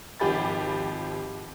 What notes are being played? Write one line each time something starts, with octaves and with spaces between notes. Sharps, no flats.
G#1 F3 G4 B5 A6